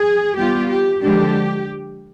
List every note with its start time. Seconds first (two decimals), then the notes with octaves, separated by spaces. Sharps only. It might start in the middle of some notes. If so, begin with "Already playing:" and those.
Already playing: G#4
0.37 G3 B3 F4 G4
0.70 G4
1.03 D3 F3 G#3 D4 G4